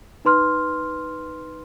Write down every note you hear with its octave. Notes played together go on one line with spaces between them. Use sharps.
D#4 B4 C6 F6